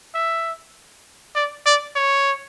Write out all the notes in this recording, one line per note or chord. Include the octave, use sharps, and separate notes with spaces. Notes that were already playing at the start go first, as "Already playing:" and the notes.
E5
D5
D5
C#5